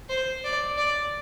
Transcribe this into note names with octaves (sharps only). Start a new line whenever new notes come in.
C5
D5
D5